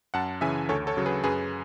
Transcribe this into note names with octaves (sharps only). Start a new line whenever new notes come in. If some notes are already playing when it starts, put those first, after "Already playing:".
F#2 F#5 A5
C#3 E3 E5 G#5
D2 A4 C#5
A4 C#5
C#3 F#3
G#4 B4
F#2 G#4 B4